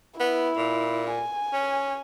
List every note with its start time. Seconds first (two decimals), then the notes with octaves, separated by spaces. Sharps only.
0.20 B3 E4
0.57 A#2
1.10 G#5
1.53 C#4